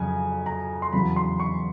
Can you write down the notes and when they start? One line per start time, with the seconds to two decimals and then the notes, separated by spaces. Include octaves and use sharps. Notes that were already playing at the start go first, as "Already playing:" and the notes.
Already playing: F2 C#3 F#3 G#5
0.46 A#5
0.82 C6
0.93 E2 C#3 F#3 B5
1.16 C6
1.40 C#6